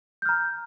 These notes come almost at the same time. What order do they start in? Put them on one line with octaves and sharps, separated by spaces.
G6 F6 A#5